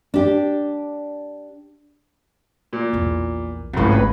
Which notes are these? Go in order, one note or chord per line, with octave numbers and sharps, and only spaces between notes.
D4 G4
A#2
A#1 E2
D#1 G#1 C#2 A2
B4